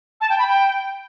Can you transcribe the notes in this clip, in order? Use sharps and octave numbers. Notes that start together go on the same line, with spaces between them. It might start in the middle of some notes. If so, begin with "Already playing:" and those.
A5
G5
B5
G5